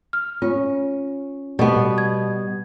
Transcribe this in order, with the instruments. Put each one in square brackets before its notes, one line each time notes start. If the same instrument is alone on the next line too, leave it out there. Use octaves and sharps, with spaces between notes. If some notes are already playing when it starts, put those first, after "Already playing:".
[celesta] F6
[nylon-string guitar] C#4 [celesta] F4
[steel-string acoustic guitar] B2 [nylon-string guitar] G3 B3
[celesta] G#6